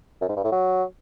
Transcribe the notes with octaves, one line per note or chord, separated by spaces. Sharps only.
F#2
G#2
G2
A2
F#3